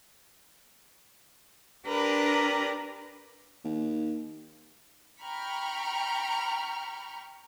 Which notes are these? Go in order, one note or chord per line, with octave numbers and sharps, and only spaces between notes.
D4 G4 A#4 B4 A#5
D#2
G5 A#5 B5 C#6 F6